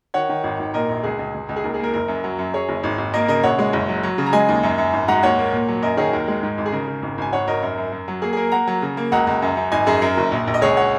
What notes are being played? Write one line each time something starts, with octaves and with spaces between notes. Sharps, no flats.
D#3 C#5 F#5
D#3
G#1
G#1
A#2 A#4 D#5
A#1 A#4
C#2 G#4
C#2
C#2
C#2
G#4
D#2 A#4
G#4
A#3 A#4
F#1 A#4
F#2
F#3
F#2
F#2 G#4 C#5
F#1
G#1
G#1
A#3 A#4 D#5
C#3 A#4 D#5
A#1 C#5 F#5
G#3
F#1
F#3
F#3
C#3
A#5
G#3 D#5 G#5
D#2
F#2
F#2
G#1
G#2 F#5 A#5
D#2 C#5 F#5
A#3
A#2
F#3
F#2 A#4 D#5
D#3 G#4 C#5
D#2 A#4
G#3
G#2
G#1
G#4
C#3 A#4
C#3
G#1
G#1 G#5
G#1 C#5 F#5
G#1 A#4 D#5
F#2 A#4
F#2
F#2
F#3
A#3 G#4
G#4
A#3 A#4
A#3 F#5 A#5
F#3
C#3
A#3
C#2 F#5 A#5
C#2
F#2
F#2
G#1 D#5 G#5
F#2 G#4
F#2 A#4
F#1
A#1
A#1
D#5
C#2 G#4 C#5
C#5 F#5